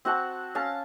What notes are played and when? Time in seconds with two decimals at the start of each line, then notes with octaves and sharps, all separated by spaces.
0.05 C4 F#4 F#5 A5
0.55 C#4 F5 A5